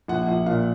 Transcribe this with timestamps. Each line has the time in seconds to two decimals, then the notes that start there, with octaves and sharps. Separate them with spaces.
0.08 A#1 F#5
0.27 A#1
0.46 A#2 F5